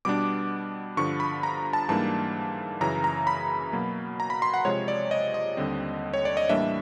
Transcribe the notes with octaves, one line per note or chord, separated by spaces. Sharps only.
B2 G3 B3 D4 D6
G2 D3 F3 C#6
B5
A#5
A5
G#2 E3 G3 A#3 D4 A5
F#2 C#3 E3 A#5
A#5
B5
B2 F#3 A#3
A#5
B5
C6
F#5
C3 F3 G#3 C#5
D5
D#5
D#5
D#2 D3 G3 C4
C#5
D5
D#5
A2 E3 G3 A#3 D4 E5